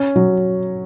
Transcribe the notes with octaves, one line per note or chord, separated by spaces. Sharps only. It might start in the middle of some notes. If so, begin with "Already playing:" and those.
Already playing: C#4
F#3